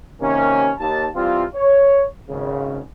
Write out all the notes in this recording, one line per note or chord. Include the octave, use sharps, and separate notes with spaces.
C3 D#3 A#3 C#4
D#2 A5
C3 E3 G3 C4 F4
C#5
G#1 C#3